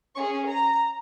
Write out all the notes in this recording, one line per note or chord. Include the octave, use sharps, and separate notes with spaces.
C#4 G#4 C#6
A#5